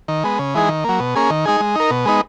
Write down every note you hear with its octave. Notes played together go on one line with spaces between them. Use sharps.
D#3
G#3 B3
C#3
E3 G#3 D#4 G#4
D#3
F#3 A#3
B2
A#3 C#4 G#4
D#3
G#3 D#4 G#4
G#3
D#4 A#4
B2
G#3 B3 D#4